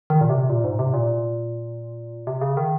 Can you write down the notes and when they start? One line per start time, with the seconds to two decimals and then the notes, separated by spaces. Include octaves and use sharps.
0.10 D#3
0.21 A#2
0.30 C3
0.49 A#2
0.64 G#2
0.79 C3
0.94 A#2
2.27 C3
2.41 C#3
2.57 D#3